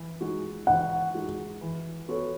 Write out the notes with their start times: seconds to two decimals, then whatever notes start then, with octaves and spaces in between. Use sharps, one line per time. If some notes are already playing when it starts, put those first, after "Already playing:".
Already playing: E3
0.21 G#3 D#4 F#4
0.67 E3 F#5
1.14 G#3 D#4 F#4
1.61 E3
2.08 B3 F#4 A4 C#5